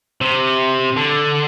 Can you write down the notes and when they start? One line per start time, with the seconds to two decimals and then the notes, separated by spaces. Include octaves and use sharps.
0.21 C3
0.96 D3